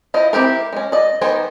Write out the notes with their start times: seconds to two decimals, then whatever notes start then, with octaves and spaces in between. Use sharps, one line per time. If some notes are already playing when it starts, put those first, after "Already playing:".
0.14 E4 F4 C5 D#5
0.33 C4 E4 G4 A#4
0.73 G#3 C#4
0.92 D5 D#5
1.21 D#3 B3 A#4 C5 G#5